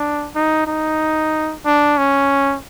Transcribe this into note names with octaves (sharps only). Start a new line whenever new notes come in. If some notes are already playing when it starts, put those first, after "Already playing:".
Already playing: D4
D#4
D#4
D4
C#4